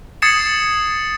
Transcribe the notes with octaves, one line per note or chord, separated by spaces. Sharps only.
D#6 G#6 A6 C7 C#7 E7